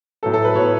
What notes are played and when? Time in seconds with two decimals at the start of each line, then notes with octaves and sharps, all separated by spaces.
0.23 A2 F#3 B3 A4
0.34 A4
0.44 B4
0.55 A2 F#3 B3 C#5